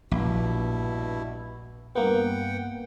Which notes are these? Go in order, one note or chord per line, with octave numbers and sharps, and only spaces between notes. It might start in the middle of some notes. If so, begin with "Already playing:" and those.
A#1 G2 B2 E4
G2 A#3 B3 F#5 G5